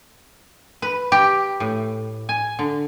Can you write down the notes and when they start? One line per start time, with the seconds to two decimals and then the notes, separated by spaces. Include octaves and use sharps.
0.82 B4
1.12 G4
1.60 A2
2.29 G#5
2.59 D3